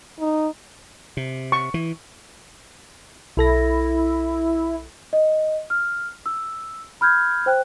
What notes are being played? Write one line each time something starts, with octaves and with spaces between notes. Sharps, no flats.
D#4
C3
C#6
E3
B1 E4 A4 A#6
D#5
F6
E6
B5 F6 G6 G#6
C5 G5 F#6